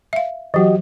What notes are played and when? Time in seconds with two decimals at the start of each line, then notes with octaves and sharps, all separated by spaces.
0.13 E5 F5
0.54 E3 F#3 F#4 G4 D#5